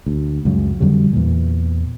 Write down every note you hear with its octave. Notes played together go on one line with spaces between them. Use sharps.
D2
C#2 F#2
F2 D3 F#3 G3
E2 A#2